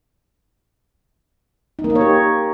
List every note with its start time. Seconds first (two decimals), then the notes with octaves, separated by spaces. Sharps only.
1.79 D#4
1.84 A#3
1.90 D#4
1.95 C#5
2.01 G4